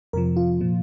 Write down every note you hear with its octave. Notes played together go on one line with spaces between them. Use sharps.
F2 C3 F3 A#4
F4
A#2 F3